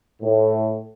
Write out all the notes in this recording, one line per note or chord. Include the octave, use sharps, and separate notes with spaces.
A2